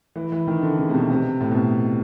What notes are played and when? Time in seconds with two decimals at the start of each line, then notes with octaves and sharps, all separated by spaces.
0.16 E3
0.32 E3
0.47 D#3
0.63 D3
0.78 C#3
0.89 C3
0.94 B2
1.10 C3
1.41 A2
1.51 B2